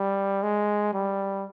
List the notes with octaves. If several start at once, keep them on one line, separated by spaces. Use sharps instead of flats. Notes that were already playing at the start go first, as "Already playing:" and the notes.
Already playing: G3
G#3
G3